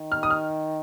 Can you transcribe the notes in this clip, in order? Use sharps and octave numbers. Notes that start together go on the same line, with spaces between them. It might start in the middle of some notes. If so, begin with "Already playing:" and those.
Already playing: D#3
F6
D#6
F6